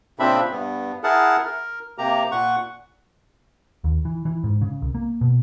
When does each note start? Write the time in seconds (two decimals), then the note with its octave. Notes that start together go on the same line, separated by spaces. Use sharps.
0.19 A#2 C#3 C4 D4 E5 B5
0.51 G2 B3
1.04 E4 G#4 A#4 F#5 A5
1.45 A#4
1.98 C3 A#3 G4 A#5
2.32 A#2 F#5 C#6
3.84 D#2
4.05 E3
4.25 E3
4.44 G#2
4.61 C#3
4.82 C2
4.95 A#3
5.21 B2